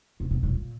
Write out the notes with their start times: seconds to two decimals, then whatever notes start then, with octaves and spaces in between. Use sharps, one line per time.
0.20 C3
0.31 B2
0.43 A2
0.50 A#2